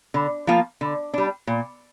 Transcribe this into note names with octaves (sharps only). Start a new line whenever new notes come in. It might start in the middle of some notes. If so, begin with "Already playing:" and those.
D3
F3 A#3 F4
D3
G3 D4
A#2